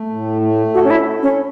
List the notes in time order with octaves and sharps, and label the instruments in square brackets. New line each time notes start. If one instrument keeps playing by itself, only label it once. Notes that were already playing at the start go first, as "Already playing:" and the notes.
Already playing: [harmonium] A3
A2
A3
[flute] F#4 [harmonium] A4
[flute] C#4
E4
[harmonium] A4
[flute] C#4